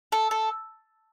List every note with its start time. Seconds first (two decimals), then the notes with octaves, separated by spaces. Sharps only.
0.12 A4
0.31 A4